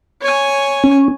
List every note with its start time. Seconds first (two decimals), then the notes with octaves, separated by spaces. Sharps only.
0.23 C#5 G#5
0.84 C#4